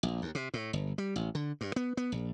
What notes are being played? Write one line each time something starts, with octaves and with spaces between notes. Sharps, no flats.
A#1
D#2
C3
A2
G1
G3
A1
D3
G2
B3
B3
A#1